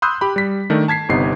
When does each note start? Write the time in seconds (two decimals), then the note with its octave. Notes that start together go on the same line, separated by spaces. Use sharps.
0.02 B5 C6 D#6 E6 F#6 G6
0.21 G4 B5
0.36 G3 B6
0.70 D#3 A3 D4
0.88 A5 G#6 B6 C7
1.09 G1 C3 B3 D#4 C7